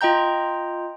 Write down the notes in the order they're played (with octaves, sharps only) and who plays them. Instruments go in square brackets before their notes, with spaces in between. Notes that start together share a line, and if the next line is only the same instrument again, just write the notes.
[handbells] F4 D#5 G5 A#5 G6